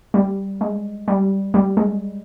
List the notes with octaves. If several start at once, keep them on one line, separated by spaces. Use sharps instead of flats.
G3
G#3
G3
G3
G#3